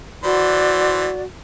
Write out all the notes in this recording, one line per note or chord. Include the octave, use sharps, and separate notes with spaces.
E3 F#4 C5 D5